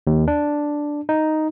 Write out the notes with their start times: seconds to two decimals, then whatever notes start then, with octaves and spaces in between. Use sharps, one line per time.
0.07 D#2
0.28 D4
1.09 D#4